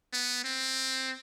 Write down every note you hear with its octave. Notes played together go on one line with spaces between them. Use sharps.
B3
C4